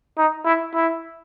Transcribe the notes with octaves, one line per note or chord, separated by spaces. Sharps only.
D#4
E4
E4